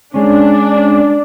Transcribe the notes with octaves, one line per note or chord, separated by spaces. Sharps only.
G#3 C#4 D4